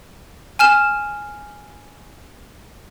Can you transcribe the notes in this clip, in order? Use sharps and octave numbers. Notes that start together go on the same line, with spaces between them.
G#5 F6 E7